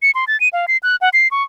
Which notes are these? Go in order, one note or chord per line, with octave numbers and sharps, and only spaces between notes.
C#7
C6
A6
D#7
F5
C7
F#6
F#5
C7
C#6